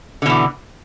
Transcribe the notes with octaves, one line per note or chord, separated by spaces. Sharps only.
B2 D3 E3